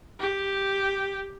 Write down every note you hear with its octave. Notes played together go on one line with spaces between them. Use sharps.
G4